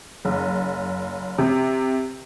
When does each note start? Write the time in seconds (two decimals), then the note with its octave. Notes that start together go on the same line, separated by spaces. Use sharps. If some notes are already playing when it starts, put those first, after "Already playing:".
0.25 F#1
1.38 C3